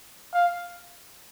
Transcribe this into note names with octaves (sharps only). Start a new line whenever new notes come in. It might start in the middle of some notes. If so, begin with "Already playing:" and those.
F5